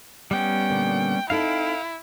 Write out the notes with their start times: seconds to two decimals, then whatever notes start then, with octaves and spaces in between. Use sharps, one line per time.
0.31 G3 B3 C#4 G5
0.71 A#2 D3 A#3
1.30 C4 D#4 E4 A4 F5 G5